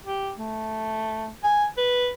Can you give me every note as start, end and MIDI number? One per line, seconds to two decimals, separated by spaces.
0.06 0.32 67
0.38 1.28 57
1.44 1.66 80
1.78 2.09 71